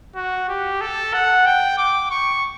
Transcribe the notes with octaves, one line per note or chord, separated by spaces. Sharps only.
F#4
G4
A4
F#5
G5
D6
C#6